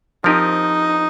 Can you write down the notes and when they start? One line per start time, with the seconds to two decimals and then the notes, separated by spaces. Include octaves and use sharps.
0.24 F3 C4 D#4 G4 A#4 D#5